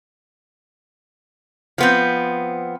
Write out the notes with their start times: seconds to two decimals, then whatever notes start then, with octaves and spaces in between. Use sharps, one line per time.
1.78 F3 B3 C4